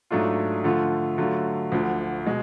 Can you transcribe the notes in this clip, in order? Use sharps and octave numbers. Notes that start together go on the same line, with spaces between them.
G#2 F#3 A3 D4 F4
D3 F3 A3 F4
D3 F#3 A3 F4
D2 D3 F3
B2 G#3